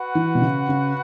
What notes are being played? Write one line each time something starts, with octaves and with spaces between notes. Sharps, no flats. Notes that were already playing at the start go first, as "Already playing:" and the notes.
Already playing: F#4 B4 F#5
E3
B2
C#3
C#3